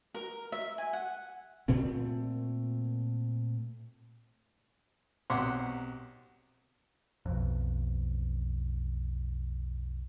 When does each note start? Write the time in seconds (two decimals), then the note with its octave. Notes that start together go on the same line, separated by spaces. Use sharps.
0.15 A#4
0.52 E5
0.78 G#5
0.93 F#5
1.68 A#2 A3 C4
5.30 B1 C3 C#5 F#5 C6 D6
7.26 B1 F2